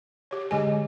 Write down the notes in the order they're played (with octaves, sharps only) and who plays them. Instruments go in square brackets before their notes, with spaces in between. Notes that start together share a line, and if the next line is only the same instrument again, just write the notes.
[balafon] G4 C#5
[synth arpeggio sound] D3 G#3 G#4 [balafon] G4 D#5 G#5